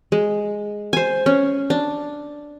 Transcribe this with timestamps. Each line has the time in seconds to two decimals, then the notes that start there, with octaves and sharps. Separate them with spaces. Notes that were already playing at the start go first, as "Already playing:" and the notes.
0.12 G#3
0.93 C5 G#5
1.26 C#4
1.70 D4